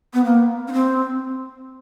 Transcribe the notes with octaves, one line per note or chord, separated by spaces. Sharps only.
B3
A#3
C#4
C4